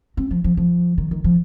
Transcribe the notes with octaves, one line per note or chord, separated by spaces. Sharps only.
C4
F3
F3
F3
D#3
D#3
F3